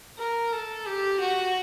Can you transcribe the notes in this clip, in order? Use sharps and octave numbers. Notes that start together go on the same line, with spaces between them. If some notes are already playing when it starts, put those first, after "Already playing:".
A#4
A4
G4
F#4